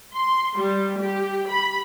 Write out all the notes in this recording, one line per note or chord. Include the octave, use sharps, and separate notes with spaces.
C6
G3
G4
B5